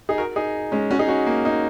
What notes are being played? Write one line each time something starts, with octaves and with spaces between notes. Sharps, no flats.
D#4 G#4
F#4 A#4
D#4 G#4
G#3 C#4
C#4 F#4
D#4 G#4
C#4 F#4
A#3
A#3 D#4